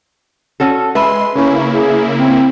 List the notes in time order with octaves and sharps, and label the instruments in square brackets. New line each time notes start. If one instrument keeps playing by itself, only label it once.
[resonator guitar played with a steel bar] C#4 F#4 A4
[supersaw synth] G#3 C6 [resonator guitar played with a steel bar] B4 E5
[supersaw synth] C#3 A#3 E4 [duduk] C#4
[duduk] G#4
C4